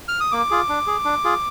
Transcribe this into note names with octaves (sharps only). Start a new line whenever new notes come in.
F6
D#6
A#3 D6
F4 G#4
D4
G#4
D4
F4 G#4